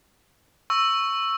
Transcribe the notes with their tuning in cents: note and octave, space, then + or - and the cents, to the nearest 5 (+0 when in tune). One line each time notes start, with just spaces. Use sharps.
C#6 +0 E6 +0